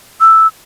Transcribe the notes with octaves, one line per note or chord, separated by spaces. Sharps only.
E6